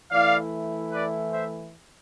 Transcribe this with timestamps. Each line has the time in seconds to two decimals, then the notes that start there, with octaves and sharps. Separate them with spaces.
0.11 E3 A3 E4 D5 F5
0.92 B4 D5
1.33 C5 E5